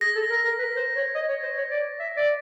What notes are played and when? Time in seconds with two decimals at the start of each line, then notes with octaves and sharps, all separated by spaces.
0.01 G#4 A#6
0.15 A4
0.30 A#4
0.44 A#4
0.58 B4
0.76 C5
0.96 C#5
1.15 D#5
1.29 C#5
1.43 C5
1.57 C#5
1.71 D5
1.99 E5
2.17 D5